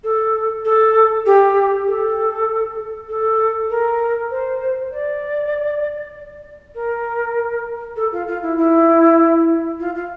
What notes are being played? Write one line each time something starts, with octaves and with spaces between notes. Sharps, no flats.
A4
A4
G4
A4
A4
A#4
C5
D5
A#4
A4
F4
F4
E4
E4
F4
F4